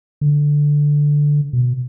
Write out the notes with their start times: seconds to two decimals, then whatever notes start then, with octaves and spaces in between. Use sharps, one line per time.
0.21 D3
1.53 B2